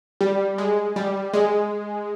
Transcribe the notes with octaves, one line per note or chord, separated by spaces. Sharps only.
G3
G#3
G3
G#3